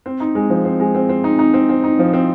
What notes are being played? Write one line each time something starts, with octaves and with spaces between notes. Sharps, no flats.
C4
D#4
G#3
F3
C4
G#3
C4
C4
D#4
D#4
C4
C4
D#4
F3
C4